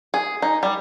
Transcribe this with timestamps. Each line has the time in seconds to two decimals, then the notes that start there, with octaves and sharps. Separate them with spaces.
0.14 G#4
0.42 D#4
0.63 G3